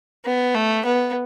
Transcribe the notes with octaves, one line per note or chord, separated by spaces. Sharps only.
B3
A3
B3